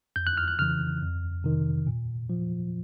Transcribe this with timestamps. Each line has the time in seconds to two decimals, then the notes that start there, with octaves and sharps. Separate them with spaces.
0.16 F2 G6
0.27 F#6
0.37 F6
0.48 F#6
0.59 C#3 E3 F6
1.02 F2
1.44 C3 D#3
1.87 A#2
2.30 F3